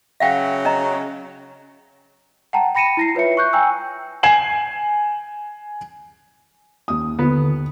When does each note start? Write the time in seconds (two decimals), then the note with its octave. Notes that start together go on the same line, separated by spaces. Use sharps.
0.20 C#3 F#3 E5 F5 G5
0.65 C#4 D#5 A#5
2.53 F#5 G5 A5 A#5
2.75 G5 B5 A#6 C#7 D#7 E7
2.97 E4 A#6 C7
3.15 F4 B4 C#5 E5 C#7
3.37 C#6 F#6 G6
3.53 G5 G#5 A#5 E6
4.23 G#5 G#6 C7 E7 F#7
6.88 D#2 D#6
7.19 D3 B3